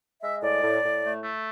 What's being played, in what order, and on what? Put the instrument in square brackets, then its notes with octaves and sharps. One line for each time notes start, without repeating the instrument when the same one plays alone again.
[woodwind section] G#3 E5
A2 D5
A2
A2
A3
A3